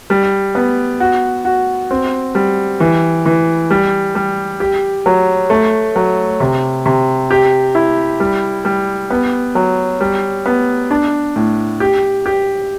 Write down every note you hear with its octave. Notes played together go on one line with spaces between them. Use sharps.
G3
B3
F#4
F#4
C4
G3
E3
E3
G3
G3
G4
F#3
A3
F#3
C3
C3
G4
E4
G3
G3
B3
F#3
G3
B3
D4
A2
G4
G4